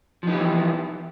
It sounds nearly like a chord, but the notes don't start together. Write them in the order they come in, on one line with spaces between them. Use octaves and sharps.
F3 D#4 G4 E3